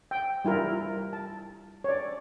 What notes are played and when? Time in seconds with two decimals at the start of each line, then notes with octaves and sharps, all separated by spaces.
0.11 G5
0.45 G3 E4 F4 A#4
1.13 A5
1.84 C#5 D5